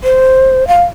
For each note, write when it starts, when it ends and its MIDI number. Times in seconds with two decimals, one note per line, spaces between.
0.04 0.67 72
0.68 0.84 77